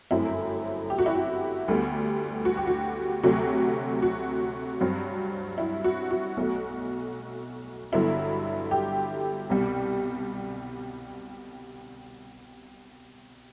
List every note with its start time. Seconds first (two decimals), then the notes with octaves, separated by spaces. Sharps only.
0.11 G1 F#2 F#3 A3 C4 E4
0.90 G4
0.98 F#4
1.06 E4
1.15 F#4
1.68 D2 D3 G3 B3
2.45 F#4
2.57 G4
2.67 F#4
3.23 D2 C3 F#3 A3 F#4
4.02 F#4
4.81 G2 F#3 C4
5.58 E4
5.84 F#4
6.11 F#4
6.37 B1 B2 A3
7.92 G1 G2 D3 F#3 B3 E4
8.71 G4
9.50 C2 B2 G3